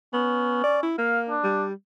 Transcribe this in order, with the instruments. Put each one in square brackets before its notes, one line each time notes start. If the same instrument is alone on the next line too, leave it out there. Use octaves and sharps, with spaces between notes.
[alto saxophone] B3 [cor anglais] C#4
[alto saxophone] D5
E4
[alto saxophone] A#3 [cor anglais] F5
[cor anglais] D4
[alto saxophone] G3